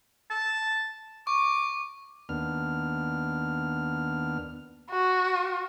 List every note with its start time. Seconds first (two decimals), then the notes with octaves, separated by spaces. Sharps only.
0.30 A5
1.27 C#6 D6
2.29 D#2 B3 D4 F6
4.90 F#4